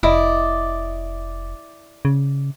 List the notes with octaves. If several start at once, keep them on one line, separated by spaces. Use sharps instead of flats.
F1 E4 D5 D#5
C#3